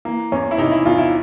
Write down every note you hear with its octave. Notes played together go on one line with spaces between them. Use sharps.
E3 A#3
E2 C#4
E4
C3 D#4
E4
E2 F4
E4